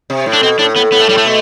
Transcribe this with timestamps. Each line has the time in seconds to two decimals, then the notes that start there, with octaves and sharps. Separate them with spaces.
0.10 C3
0.26 A2
0.33 D4
0.43 B2 C4
0.59 A2 D4
0.76 A2 B3
0.92 A2 B3
1.01 A3
1.09 A2 G3
1.18 A3
1.25 B2